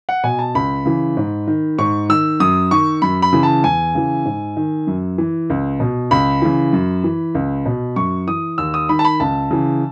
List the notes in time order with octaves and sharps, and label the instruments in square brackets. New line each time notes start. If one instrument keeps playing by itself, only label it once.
[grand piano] F#5
B2 G#5
A5
C#2 B5
C#3 E3
G#2
D#3
G#2 C#6
D#3 E6
F#2 D#6
D#3 C#6
F#2 B5
B5
C#3 E3
A5
E2 G#5
C#3 E3
G#2
D#3
F#2
E3
C#2
B2
C#2 B5
C#3 E3
F#2
E3
C#2
B2
F#2 C#6
E3 D#6
D#2 E6
D#6
D#3 B5
A5
B5
C#2 A5
C#3 E3